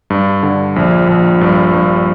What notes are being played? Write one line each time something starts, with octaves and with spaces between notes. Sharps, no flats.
G2
D3
A#1
A#1
G2
G2